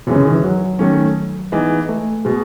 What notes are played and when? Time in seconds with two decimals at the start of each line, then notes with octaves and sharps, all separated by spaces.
0.07 F#2 B2 E3 G#3 C#4
0.16 C#3
0.25 D#3
0.34 E3
0.44 F#3
0.79 D#3 A3 C#4
1.52 E3 G#3 B3 D#4
1.89 A3
2.25 B2 G#3